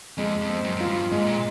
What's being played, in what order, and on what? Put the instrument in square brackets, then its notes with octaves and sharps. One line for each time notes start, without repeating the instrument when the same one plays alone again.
[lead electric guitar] F2 [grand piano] G#3
[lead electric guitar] F2
[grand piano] C4
[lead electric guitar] F#2
[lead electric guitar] F#2 [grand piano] F4
[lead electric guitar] G2
[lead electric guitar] G#2 [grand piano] G#3
[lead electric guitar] A#2